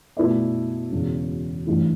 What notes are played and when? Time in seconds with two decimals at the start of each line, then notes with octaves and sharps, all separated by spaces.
0.17 B2 A3 E4 B4 D5
0.92 E1 E2 C#3
1.67 A1 G2 E3 A3 E4